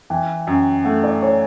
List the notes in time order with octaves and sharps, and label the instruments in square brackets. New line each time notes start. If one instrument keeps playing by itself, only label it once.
[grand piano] E3 [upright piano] G5
[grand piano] F#2
[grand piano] A3 [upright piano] F#5
[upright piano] D5
C#5